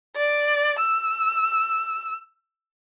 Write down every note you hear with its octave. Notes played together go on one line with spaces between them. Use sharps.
D5
E6